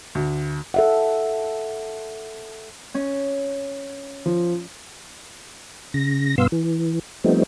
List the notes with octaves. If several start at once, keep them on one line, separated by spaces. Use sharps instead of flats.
D2
A4 E5 F#5
C#4
F3
C#3 A#6
G2 B2 B3 F5 C6 E6
E3
F3 G3 A3 B3 C4 D#4